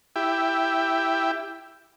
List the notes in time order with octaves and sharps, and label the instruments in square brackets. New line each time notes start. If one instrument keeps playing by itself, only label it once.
[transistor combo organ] E4 G4